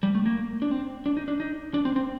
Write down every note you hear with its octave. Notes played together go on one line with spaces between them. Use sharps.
G3
A3
A#3
D4
C4
D4
D#4
D4
D#4
D4
C4
C4